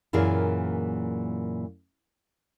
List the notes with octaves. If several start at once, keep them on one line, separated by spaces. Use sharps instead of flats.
F#2 A#2 E3 A#3 G#4